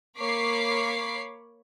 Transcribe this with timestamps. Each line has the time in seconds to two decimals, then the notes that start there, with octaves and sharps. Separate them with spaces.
0.19 A#3 C#5 B5 D6 C7